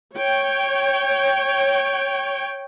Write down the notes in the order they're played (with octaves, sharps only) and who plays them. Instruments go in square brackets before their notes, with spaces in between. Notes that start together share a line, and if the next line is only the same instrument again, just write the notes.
[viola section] C#5 G5